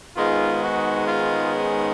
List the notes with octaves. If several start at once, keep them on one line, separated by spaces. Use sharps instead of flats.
G#2 D#3 G#3 B3 F4
F#4
F4
C#4